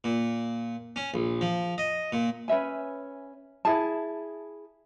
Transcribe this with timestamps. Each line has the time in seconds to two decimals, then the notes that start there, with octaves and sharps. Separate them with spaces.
0.04 A#2
0.96 C#4
1.14 A#1
1.41 F3
1.78 D#5
2.12 A#2
2.48 C#4 B4 E5 G#5
3.65 E4 G#4 A5